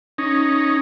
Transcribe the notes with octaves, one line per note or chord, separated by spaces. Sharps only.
C#4 D#4